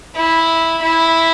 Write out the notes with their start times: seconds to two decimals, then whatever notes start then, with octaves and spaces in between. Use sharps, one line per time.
0.16 E4
0.82 E4